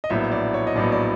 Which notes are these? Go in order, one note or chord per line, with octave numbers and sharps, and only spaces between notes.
D#5
A#1 A2 F#3 B3 E5
D5
C#5
D#5
A#1 A2 F#3 B3 D5
D5